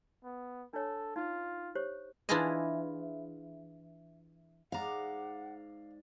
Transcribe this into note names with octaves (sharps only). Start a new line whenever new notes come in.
B3
D4 A4 C#5
D#4 F4
G4 C5 C#5
E3 D4 E4 F4 G#4 D#5
G#2 D5 F5 F#5 A#5